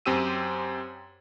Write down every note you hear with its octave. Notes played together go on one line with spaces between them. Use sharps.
F#2 C4 G4 E6 D#7